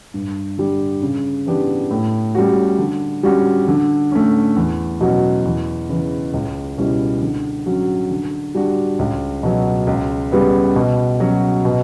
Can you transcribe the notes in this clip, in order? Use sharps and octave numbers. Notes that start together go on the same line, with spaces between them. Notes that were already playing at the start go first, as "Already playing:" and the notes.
G2
D3 G3 D4
C#3
E3 B3 D4 G4
A2
G3 C#4 F#4
D3
G3 C#4 F#4
D3
A3 C#4
E2
B2 F#3 C#4 F#4
E2
C#3 E3
C#2
B2 G3 C#4 E4
D3
F#3 C#4 F#4
D3
G3 D4 F#4
C#2
B2 F#3
C#2
C#3 G3 B3
B2
F#3 C#4 F#4
B2